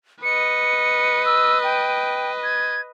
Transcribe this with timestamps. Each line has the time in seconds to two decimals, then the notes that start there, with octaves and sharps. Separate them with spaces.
0.23 B4 D#5 C#7
1.25 E6
1.64 G5
2.44 G#6